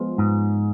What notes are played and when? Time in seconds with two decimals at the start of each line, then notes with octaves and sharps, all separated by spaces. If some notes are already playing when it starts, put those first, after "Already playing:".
Already playing: F3 G#3 B3 F4
0.18 G#2